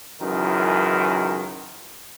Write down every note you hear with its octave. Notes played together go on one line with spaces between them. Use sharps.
C#2 F#2 D#3 E3